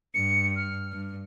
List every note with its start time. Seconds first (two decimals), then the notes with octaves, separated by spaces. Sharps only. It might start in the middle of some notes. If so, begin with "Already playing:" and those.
0.14 G2 C#7
0.56 F6
0.90 G2